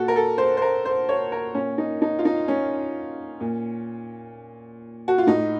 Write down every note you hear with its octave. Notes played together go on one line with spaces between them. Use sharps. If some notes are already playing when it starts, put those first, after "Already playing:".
Already playing: A#2 F#4 A4
A#4
A4
C5
C5
A#4
C5
C#5
A#4
A#2 C#4
D#4
D#4
F4
D#4
C#4
A#2
F#4
F4
A2 D#4